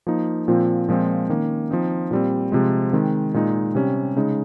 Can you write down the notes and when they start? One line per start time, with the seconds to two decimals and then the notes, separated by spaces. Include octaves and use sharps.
0.07 F3 A#3 D#4
0.48 A#2 F3 C4
0.89 A#2 F3 G#3 C4
1.29 D#3 A#3 C#4
1.70 F3 C4 D#4
2.11 A#2 G3 C4
2.52 C3 F3 G#3
2.93 D#3 G#3 C4
3.34 A#2 G#3 D#4
3.75 C3 G3 C#4
4.16 C#3 G#3 D#4